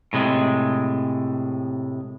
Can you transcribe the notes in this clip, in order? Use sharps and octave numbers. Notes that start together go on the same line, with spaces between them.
A2 C3 G#3